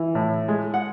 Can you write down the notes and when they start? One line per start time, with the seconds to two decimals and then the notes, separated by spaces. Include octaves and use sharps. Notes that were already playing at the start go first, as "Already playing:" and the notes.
Already playing: E3
0.15 A2
0.48 G#3
0.74 F#5